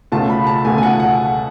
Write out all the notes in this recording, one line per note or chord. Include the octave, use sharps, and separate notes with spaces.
C#2 B2 A3 F4 A5
B5
A5
C#2 B2 A3 F4 G#5
G#5
F#5
F#5